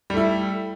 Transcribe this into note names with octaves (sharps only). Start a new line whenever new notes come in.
G3 A3 E4